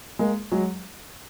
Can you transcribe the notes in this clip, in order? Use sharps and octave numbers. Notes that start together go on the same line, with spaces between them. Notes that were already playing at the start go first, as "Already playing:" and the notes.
G#3 A#3
F#3 G#3